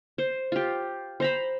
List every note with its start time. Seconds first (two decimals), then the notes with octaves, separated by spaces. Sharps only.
0.18 C5
0.52 F4 G4
1.20 C5 A#5 B5